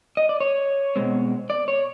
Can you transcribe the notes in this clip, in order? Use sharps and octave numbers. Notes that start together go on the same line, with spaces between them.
D#5
D5
C#5
B2 G#3 C4
D5
C#5